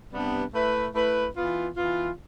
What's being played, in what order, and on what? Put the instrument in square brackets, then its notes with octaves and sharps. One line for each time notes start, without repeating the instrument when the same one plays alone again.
[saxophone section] C3 G3 B3 D4
A3 E4 B4
A3 E4 B4
E3 B3 F4
E3 B3 F4